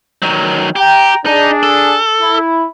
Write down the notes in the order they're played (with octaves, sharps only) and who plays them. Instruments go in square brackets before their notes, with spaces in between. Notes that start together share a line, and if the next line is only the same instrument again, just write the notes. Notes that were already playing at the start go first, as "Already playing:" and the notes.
[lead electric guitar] D#3 F#3
[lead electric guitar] G4 [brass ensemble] G5 A#5
[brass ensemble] D4 G#4 [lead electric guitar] D#4
[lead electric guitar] A4
[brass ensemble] E4